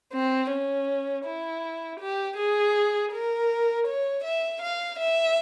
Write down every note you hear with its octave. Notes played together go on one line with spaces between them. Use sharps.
C4
C#4
E4
G4
G#4
A#4
C#5
E5
F5
E5